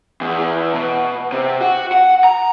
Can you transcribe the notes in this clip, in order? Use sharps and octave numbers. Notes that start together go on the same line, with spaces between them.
E2
B2
C3
F#4
F#5
A#5